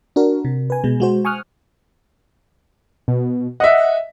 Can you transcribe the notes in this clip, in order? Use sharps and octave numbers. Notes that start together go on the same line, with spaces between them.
D4 F#4 A#4
C3
B4 G#5
B2 G#3
G#3 F#4 C5
G#5 C#6 D#6 F6 F#6
B2
D#5 E5 F#5